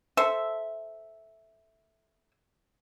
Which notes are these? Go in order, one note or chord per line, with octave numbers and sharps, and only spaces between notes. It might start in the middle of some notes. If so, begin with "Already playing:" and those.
A4 C5 E5